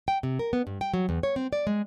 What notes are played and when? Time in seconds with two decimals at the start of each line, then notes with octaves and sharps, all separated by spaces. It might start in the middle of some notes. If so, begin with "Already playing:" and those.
0.08 G5
0.23 C3
0.39 A#4
0.53 B3
0.67 G2
0.81 G5
0.94 F#3
1.09 E2
1.23 C#5
1.36 C4
1.53 D5
1.67 G#3